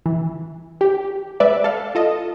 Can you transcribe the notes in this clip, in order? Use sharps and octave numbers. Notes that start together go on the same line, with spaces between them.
E3
G4
G#3 B4 D5 E5
A4 F5
F4 A4 D#5